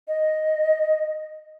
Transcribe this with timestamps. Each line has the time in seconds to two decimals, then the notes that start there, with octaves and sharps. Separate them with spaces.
0.08 D#5